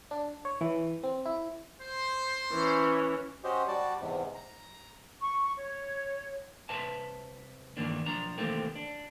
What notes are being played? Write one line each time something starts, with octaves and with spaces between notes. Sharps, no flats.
D4
C#5
E3
C4
E4
C5
E3 C#4
C#4 F#4 G4 C5 D#5
G3 F#4 D5 A5
E2 G#2 C3
A#5
C#6
C#5
C2 B4 E5 A5
G2 D#3 E3 A#3 D4
B1 F3 D4 A#5
C3 D#3 E3 A3 A#3 C4
D4